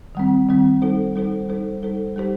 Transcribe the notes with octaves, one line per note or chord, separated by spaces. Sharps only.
D#3 G3 C4
D#3 G3 C4
G3 D#4 A4 C5
G3 D#4 A4 C5
G3 D#4 A4 C5
G3 D#4 A4 C5
G3 D#4 G4 C5